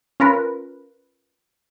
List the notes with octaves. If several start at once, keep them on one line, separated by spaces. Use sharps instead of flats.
C#4 F4 A#4 B4